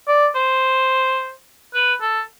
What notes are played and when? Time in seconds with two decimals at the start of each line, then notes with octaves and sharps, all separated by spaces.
0.08 D5
0.36 C5
1.74 B4
2.02 A4